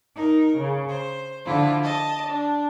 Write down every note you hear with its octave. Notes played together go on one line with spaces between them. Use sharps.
D#4 A#4
C#3
C5
D3 F3 E4 F4
D#5 A5
D4